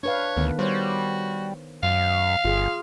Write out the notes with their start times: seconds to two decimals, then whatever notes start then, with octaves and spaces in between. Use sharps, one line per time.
0.03 D4 B4 C#5 F5
0.37 D2 D#3 B3
0.59 G3 F#4 C5 C#5
1.83 F#2 F5
2.45 G1 F4 G#4